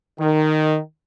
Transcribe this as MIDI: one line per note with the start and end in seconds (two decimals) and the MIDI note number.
0.19 0.80 51